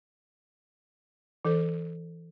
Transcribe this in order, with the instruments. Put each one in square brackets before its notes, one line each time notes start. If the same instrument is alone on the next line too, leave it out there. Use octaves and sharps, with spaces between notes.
[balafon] E3 A4 C5